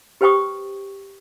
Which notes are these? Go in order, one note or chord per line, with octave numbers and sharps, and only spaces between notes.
G4 B4 C5 G5 C#6 D#6